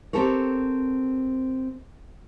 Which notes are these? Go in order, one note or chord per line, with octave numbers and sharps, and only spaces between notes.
C4 G4 A4 A#4 C#5